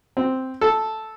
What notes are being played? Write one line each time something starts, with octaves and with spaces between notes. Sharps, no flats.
C4
A4